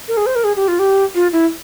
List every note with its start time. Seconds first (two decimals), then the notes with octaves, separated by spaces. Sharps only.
0.08 A#4
0.17 G#4
0.26 C5
0.36 A#4
0.44 G#4
0.56 G4
0.68 F4
0.79 G4
1.15 F4
1.33 E4